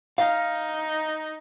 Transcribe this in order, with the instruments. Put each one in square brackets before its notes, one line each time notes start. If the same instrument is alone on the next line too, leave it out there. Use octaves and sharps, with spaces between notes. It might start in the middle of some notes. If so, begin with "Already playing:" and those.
[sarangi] D#4 [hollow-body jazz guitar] F5